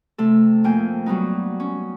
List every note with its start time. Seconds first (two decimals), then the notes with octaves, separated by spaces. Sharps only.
0.18 C3 A3 A4
0.64 F2 A#3 G5 G#5 G6
1.06 F#3 G3 B3 D#4
1.60 C#4